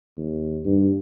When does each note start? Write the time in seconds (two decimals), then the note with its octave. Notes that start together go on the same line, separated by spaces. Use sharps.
0.17 D#2
0.65 G2